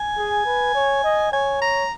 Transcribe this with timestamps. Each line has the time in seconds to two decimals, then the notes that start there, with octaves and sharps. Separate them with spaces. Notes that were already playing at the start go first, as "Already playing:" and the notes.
Already playing: G#5
0.17 G#4
0.46 B4
0.75 C#5
1.04 D#5
1.32 C#5 G#5
1.62 A#5